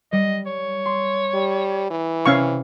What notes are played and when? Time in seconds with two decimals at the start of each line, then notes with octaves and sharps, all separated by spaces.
0.13 G3 D#5
0.46 C#5
0.86 C6
1.34 G3
1.91 E3
2.26 C3 C#4 F5 C#6